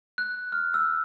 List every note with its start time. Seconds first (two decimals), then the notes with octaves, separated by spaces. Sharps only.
0.18 F#6
0.52 F6
0.74 E6